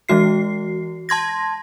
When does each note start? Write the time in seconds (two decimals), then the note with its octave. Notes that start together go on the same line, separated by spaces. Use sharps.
0.09 E3 G#3 F#4 C7
1.09 A5 C6 G#6 A#6